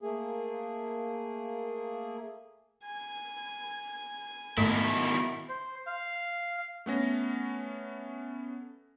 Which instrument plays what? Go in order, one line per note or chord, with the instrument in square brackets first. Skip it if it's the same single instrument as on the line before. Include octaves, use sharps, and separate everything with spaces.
[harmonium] A3 A#3 G#4
[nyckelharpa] G#5
[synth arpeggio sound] G#2 A3 [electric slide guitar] B2 D#3 E4
[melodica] C5
F5
[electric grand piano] A3 B3 C#4 A#6